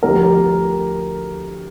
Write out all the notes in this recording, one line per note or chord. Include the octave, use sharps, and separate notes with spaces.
D2 D3 F3 G4 A#4